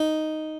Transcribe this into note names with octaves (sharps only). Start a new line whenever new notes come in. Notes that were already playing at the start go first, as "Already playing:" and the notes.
Already playing: D#4